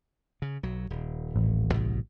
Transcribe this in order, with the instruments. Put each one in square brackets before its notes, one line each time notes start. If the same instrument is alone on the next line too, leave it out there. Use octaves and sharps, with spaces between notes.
[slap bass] C#3
B1 F#3
D#1
[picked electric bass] A1
[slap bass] C2 B2